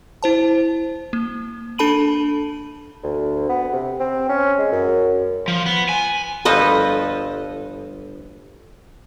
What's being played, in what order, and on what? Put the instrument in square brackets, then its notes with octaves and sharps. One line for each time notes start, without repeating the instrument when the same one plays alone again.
[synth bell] E4 C5 A5
A#3
D4 A4 A5 B5 D#7 F#7
[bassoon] D2
B3
C3
C4
C#4
G#3
F#2
[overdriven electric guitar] F3
B3
G#5
[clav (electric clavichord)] G1 F3 [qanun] A4 B4 D#5